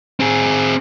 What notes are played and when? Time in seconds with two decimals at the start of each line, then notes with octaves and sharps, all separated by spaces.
0.20 C4 G#4